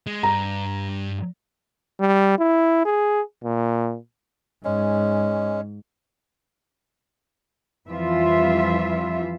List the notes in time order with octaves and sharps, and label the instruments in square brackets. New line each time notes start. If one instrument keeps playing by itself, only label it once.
[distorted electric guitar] G#3
[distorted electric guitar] G2 [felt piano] A#5
[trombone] G3
E4
G#4
A#2
[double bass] G#2 [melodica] G#3 C#4
[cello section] F2 E3 F3 G3 F4 E5